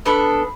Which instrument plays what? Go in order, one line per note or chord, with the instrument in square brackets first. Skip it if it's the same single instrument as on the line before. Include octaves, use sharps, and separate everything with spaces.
[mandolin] B3 D4 A4 B5